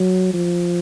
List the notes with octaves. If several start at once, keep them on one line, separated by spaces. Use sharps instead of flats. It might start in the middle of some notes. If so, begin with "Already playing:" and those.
Already playing: F#3
F3